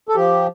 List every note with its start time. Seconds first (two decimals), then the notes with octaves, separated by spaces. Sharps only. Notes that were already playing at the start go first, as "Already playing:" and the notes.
0.09 A4
0.15 F3 G4